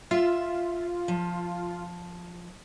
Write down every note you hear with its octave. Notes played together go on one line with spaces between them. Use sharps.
F4 E5
F3